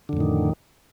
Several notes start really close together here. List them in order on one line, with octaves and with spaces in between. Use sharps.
D3 F2 A2 D#3